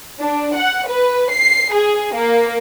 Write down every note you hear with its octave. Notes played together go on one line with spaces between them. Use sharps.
D4
F#5
B4
C7
G#4
A#3